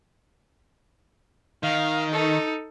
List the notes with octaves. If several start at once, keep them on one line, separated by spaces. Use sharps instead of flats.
D#3 F5
D#4 A4